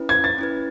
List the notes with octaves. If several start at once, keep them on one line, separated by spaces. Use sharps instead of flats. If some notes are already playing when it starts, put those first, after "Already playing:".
Already playing: C#4 E4 B4
G#6
A6
C#4 E4 B4